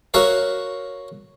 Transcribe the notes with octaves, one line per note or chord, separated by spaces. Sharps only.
F#4 A#4 C#5 E5 F5